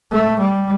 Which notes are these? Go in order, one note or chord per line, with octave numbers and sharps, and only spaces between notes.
A3
G3